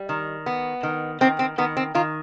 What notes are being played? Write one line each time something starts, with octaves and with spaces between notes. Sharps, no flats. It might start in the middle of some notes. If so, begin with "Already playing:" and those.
Already playing: G3
D#3
B3
D#3
D#3 C4
C4
D#3 B3
C4
D#3 F4